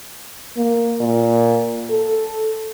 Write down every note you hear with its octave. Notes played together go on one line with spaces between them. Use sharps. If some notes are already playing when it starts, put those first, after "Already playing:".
A#3
A#2
A4